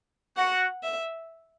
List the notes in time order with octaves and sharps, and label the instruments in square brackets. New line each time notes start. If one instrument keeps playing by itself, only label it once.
[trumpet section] F#4 [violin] F#5
[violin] E5